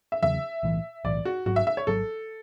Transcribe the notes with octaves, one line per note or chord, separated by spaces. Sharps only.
E5
E2 C#3 F#3 E5
B1 A2 E3
B1 A2 E3 D5
F#4
G#1 G#2 F#3 F#4
E5
E5
C#5
G#1 G#2 F#3 A4